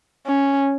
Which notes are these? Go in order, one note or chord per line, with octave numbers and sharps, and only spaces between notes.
C#4